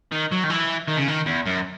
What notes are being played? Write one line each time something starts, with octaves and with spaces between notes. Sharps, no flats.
D#3
F#3
D#3
E3
D#3
C#3
D#3
E2
F#2